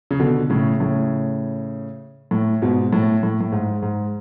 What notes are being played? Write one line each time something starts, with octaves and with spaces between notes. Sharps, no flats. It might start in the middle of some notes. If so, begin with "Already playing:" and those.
C#3
B2 D3
A2 C#3
A2 C#3
A2
G#2 B2
A2
A2
A2
G#2
G#2